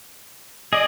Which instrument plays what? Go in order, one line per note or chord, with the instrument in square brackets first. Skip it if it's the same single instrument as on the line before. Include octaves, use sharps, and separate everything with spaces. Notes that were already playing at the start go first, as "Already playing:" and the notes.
[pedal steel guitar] G#4 D5 [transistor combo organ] D#5